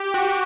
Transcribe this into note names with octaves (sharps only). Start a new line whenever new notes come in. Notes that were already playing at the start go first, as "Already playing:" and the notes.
Already playing: G4
F#4